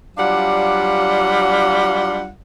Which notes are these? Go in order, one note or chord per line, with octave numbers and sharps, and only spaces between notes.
F#3 G3 D4 F4 F5 F#5